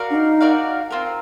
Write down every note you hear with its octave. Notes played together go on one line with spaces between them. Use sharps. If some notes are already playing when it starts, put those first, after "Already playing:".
Already playing: F#4 A#4 D5 F5
D4
D#4
F#4 A#4 D5 F5
C4 F4 A#4